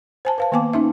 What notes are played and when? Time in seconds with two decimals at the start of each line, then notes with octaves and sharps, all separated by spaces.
0.25 C5 G#5 A5
0.38 B4 F5 A5
0.52 D#3 A#3 B3 G#5 A5 D6
0.73 C#4 D#4 E5